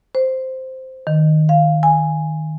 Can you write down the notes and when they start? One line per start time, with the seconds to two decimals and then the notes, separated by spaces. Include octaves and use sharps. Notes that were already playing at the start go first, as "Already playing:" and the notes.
0.15 C5
1.07 D#3
1.49 F5
1.83 G#5